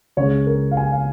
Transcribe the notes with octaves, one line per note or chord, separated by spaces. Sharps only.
C#2 C#3 G#3 C#5
A#4
F5
G#5
F5